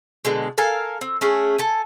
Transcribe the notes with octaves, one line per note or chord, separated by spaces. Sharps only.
B2 D3 G#3
A4 A#4 F5 G#5
C4
A3 C#4 G#4
A4 G#5